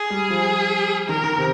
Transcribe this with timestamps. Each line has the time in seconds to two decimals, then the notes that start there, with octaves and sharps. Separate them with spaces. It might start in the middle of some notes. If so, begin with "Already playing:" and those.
Already playing: G#4
0.10 G3
0.30 F3
1.09 D#3 A#4
1.24 D#3
1.38 C3